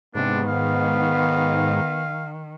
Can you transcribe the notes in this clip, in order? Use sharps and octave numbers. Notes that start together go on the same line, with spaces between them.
G#2 C3 B3 D4
D#3 F5